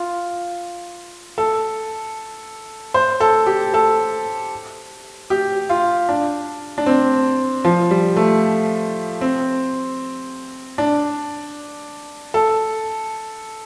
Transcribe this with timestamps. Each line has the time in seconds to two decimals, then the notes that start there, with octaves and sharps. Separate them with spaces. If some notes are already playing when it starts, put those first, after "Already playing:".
Already playing: F4
1.38 A4
2.94 C5
3.20 A4
3.47 G4
3.74 A4
5.30 G4
5.70 F4
6.09 D4
6.78 D4
6.86 C4
7.64 F3
7.91 G3
8.16 A3
9.21 C4
10.78 D4
12.34 A4